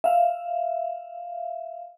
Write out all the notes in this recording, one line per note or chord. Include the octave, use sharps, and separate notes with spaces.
E5 F5